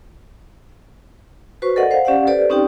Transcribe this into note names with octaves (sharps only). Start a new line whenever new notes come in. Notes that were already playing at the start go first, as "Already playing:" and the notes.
F#4 B4 C5 C#6
A4 A#4 D5 D#5 F#5
C5 F5 F#5
C#4 G4 D5 F5 F#5
G4 A4 B4 C5 D5
C4 C#4 D#4 G4 D5 G5